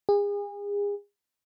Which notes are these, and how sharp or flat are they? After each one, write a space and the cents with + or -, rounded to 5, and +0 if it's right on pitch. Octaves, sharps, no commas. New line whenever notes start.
G#4 -35